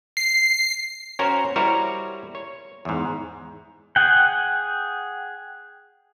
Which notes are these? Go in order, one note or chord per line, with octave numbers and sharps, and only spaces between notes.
C7
C#4 F#4 A#4 C5 C#5
G3 E4 F#4 A#4 C5 C#5
C#5
E2 G#2
G#4 F#5 G5